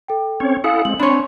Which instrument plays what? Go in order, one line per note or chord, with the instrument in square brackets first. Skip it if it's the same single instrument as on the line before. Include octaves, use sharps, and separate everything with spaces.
[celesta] A4 G5
[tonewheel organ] C4 C#4 C#5
[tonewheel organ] E4 A4 F#5 [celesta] F5 G#5 D#6
[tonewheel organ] G#3 C4 [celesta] F#7
[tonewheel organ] C4 [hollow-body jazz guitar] D4 C#5 [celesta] B5 C6 G#6